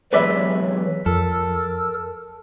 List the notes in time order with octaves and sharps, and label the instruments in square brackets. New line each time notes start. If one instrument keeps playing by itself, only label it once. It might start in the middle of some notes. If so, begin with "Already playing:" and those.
[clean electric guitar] E2 C3 G#3 [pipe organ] E3 F#3 [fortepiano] B4 D5 E5
[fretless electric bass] F2 [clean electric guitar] A4 [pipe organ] A#4 E6